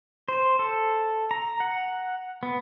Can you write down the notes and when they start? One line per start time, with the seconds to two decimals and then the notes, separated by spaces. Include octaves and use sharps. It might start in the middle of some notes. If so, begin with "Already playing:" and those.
0.28 C5
0.59 A4
1.31 A#5
1.60 F#5
2.43 B3